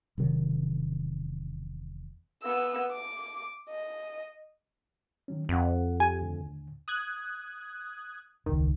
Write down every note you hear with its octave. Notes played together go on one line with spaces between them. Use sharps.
E1 C3 D#3 F#3
B3 E6
D6
D#5
D#3 F#3 C#4
F2 C4 F#5
G4 G#5
D#2 A2 D3
D#6 F#6 G#6
E1 C#2 D#3